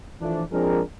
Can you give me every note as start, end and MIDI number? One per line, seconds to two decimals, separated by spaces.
0.21 0.43 52
0.21 0.43 53
0.21 0.43 57
0.21 0.43 62
0.52 0.80 53
0.52 0.80 56
0.52 0.80 60
0.52 0.80 62
0.52 0.80 68
0.52 0.80 70